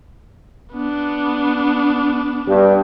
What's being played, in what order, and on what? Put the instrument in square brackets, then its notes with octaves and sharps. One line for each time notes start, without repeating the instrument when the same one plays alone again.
[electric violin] B3 D4
[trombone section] G2